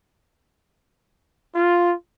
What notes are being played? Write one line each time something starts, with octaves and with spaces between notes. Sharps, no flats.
F4